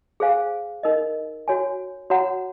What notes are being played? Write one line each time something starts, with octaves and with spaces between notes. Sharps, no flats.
G#4 C5 F5 G#5
D#4 A#4 D#5
F#4 C#5 G#5
F#4 C#5 F#5 A#5